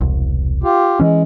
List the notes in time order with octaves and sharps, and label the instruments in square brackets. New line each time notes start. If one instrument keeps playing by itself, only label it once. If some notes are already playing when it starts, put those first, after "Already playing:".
[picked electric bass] E1 C2
[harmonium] F4 G4
[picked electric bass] E3 C#4 [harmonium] G#3